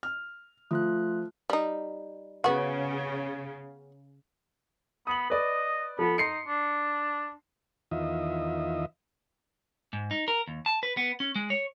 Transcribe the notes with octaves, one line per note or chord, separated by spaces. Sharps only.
F6
F3 A3 F4 F#6
G3 D#4
C#3 B3 F#4
B3 D#6 F#7
B4 D5 D#5
F3 B3 A4
D#4 C6 C7 C#7
D4
E2 D#3 F4 D#5 E5
G#2
D#4
A#4
D#2
A5
B4
B3
C#4
G#3
C#5